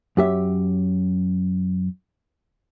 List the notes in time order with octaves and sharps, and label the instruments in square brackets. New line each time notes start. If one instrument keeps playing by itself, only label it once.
[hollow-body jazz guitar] F#2 G4 E5